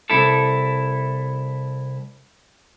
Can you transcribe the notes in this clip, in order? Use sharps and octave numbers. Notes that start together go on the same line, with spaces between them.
C2 E4 A4